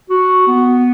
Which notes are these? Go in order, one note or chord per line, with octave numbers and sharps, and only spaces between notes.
F#4
B3